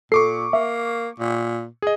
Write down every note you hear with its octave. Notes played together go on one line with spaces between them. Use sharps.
A#2 A4 C#6 D6 C7
A#3 E5
A#2
G#4 D#5